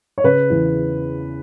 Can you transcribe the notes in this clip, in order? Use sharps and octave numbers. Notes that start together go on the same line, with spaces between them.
C#5
C#3 B4
E2